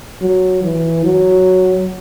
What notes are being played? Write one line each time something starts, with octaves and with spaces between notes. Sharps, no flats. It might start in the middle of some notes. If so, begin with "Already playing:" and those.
F#3
E3
F#3